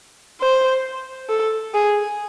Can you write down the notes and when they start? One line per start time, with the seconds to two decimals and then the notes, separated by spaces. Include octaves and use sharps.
0.41 C5
1.29 A4
1.74 G#4